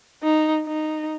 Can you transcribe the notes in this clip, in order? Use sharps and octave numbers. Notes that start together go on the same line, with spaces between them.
D#4
D#4